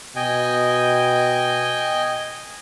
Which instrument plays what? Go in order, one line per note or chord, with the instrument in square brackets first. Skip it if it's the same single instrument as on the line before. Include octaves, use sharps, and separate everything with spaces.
[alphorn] B2 [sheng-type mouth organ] D#5 G5 G#5